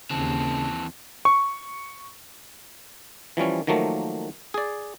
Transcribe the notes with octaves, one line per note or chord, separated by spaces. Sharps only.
D#2 C#3 E3 C4 A5
C#6
E3 F3 G3 C#4
D#3 F3 F#3 A3 A#3
G#4 D5